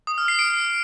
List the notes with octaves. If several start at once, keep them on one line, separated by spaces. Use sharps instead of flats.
D#6
F6
C7
D7